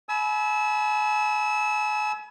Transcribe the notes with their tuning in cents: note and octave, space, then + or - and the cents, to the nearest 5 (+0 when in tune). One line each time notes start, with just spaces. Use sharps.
G#5 +35 B5 -10 E6 -25